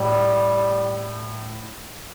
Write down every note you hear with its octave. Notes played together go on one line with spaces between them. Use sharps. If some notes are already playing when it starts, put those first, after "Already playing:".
Already playing: A2 G3